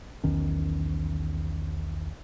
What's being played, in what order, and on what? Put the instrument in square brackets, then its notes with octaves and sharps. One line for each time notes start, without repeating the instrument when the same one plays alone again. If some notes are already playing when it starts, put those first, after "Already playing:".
[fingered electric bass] B1 E2 D#3 C#4